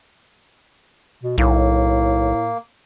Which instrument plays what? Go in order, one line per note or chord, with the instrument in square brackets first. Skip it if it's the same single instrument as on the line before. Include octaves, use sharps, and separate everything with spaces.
[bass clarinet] B2
[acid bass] B1 [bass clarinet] A2 [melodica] A#3